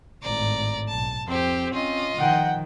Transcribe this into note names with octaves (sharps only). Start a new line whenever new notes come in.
G#1 A2 D5 A#5
B1 A5
F2 C4 G4 C5
C#4 F4 D#5
D#3 F3 F#5 G5